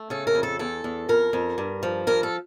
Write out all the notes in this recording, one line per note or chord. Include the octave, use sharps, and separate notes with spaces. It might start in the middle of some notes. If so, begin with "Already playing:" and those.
Already playing: A3
C#3 A4
A#4
F2
A4
E2 A4
E2
F2 A#4
F2
G2
F3
G2 A#4
A4